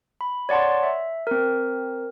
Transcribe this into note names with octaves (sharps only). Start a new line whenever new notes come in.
B5
C#5 D5 F#5 A5 C6
E5
C4 A#4